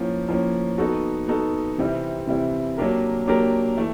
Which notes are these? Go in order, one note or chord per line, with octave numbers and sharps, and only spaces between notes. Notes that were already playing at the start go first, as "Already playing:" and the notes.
Already playing: A2 F3 A#3 C#4
A2 F3 A#3 C#4
B3 D#4 F#4 A4
B3 D#4 F#4 A4
C3 E3 G3 C4 E4
C3 E3 G3 C4 E4
F#3 A#3 D4 G4 A#4
F#3 A#3 D4 G4 A#4
E3 A3